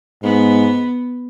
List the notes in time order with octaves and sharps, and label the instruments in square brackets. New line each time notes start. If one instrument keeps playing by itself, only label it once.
[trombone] G#2 [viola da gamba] B3